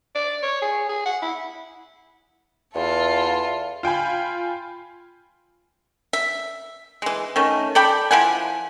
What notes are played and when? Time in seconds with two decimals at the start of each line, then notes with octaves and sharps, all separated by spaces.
0.15 D5
0.43 C#5
0.62 G#4
0.89 G#4
1.06 F#5
1.22 E4
2.75 E2 F4 A4
3.83 F4 G5 G#5 B5
6.13 E5
7.02 E3 G#3
7.36 D#3 A3 C#4
7.75 A4 D5 G5 B5
8.11 F3 E4 F#5 G#5